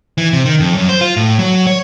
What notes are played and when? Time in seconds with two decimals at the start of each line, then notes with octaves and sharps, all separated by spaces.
0.18 E3
0.33 C3
0.46 D#3
0.60 F2
0.75 F#2
0.89 C5
1.01 F4
1.17 A2
1.39 F#3
1.67 C#5